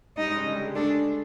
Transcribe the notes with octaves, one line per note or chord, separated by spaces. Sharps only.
G3 D#4
G#2 G#3
C#3 C#4
D3 D4
G3 G4
G#3 G#4
A3 D4 A4
G#3 G#4